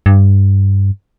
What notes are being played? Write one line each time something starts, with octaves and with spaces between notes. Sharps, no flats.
G2